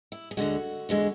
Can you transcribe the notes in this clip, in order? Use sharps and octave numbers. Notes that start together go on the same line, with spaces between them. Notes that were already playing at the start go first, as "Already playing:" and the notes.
E4
G#4
D2 D3 G#3 F#4
E2 D3 G#3